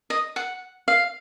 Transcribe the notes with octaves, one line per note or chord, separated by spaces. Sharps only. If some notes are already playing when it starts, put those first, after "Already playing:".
D#5
F#5
F5